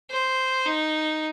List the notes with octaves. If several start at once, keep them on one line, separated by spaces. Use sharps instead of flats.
C5
D#4